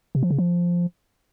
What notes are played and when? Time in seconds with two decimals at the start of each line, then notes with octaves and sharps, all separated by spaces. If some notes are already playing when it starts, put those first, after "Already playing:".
0.15 C3
0.23 F3
0.31 C#3
0.38 F3